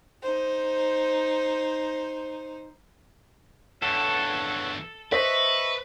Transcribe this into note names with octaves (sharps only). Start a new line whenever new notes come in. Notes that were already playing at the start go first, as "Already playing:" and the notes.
D#4 C5
E2 G2 A4 C#5 F#5
B4 C5 D#5 E5 C#6 B6